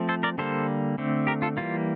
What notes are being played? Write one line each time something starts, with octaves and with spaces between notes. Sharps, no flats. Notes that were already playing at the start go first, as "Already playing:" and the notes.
Already playing: F3 A3 C4
A4 C5
A#4 D5
D3 G3 A#3 A4 C5
D3 A3 C4
G4 A#4
F4 A4
E3 G3 A#3 F4